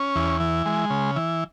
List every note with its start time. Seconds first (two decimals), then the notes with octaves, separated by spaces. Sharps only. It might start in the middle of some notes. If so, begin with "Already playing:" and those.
Already playing: C#4
0.15 E2
0.40 E3
0.66 G#3
0.90 C#3
1.16 E3